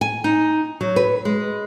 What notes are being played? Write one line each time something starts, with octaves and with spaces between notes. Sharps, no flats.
G#5
D#4
F#3
B4
G#3